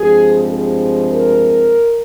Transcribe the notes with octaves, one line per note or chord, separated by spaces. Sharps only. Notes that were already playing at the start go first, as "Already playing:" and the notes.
Already playing: G2 F3 G#3 C4 G#4
G#4
A#4